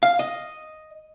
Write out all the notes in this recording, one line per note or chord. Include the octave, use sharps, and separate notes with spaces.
F5
D#5